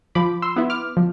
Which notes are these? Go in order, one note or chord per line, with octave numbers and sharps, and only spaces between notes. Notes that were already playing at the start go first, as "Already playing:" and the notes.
F3 B5 D6
C6 E6
B3 E4
D6 F6
F3